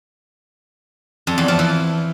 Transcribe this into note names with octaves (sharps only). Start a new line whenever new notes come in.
F2
E2
F3
E3